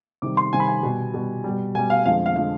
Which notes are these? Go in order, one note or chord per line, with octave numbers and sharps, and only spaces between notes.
C3 D#3 G3 D6
C6
C3 D#3 G3 G#5
B5
G#5
B2 G3
B2 G3
B2 G3
B2 G3 G#5
F5
F2 D3 F3 G#3 F5
F5
D3 F3 G#3 F5